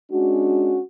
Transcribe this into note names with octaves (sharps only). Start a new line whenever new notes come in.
G#3 C#4 D4 F#4